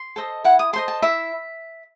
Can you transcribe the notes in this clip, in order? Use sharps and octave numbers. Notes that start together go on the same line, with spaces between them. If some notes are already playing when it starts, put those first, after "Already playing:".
Already playing: C6
A4 C5 D#5
E4 F#5
D#6
A4 C5 D#5 C6
A5
E4 E5